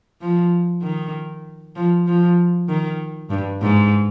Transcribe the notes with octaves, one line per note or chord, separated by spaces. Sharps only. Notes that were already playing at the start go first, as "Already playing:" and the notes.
F3
D#3
F3
F3
D#3
G2
G#2